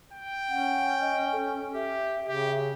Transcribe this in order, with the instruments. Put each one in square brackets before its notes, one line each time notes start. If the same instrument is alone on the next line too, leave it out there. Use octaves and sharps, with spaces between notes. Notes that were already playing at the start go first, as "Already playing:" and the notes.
[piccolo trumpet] G5
[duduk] C#4 [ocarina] F#5
[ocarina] D#5
A4
[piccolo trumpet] G4 [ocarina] E5
[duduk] C#3 [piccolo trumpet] G4